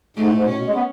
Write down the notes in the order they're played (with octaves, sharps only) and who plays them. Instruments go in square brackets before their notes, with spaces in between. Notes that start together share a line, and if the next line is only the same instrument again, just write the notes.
[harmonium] G#2 [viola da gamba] A3
[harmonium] A2
G#2
B2
[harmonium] A2 [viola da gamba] C#4
[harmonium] B2
G#3
B3